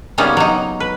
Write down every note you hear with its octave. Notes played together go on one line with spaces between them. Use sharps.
C#3 G3 A#3 B3 C#4 D#4
F#3 D#4
B4